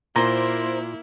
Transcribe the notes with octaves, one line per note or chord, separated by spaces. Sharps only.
A#2 A#3 E4 A#4 C5